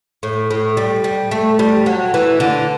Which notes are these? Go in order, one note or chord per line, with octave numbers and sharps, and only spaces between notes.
A2
A2
G3
G3
A3
G3
F#3
E3
D3